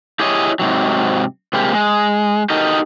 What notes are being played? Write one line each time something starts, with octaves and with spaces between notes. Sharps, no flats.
E4 G4 G#4 C#5 D#5
G#2 C3 F#3
C3 G3 G#3 A#3 G4
G#3
D#4 F#4 G4 A4 A#4 D#5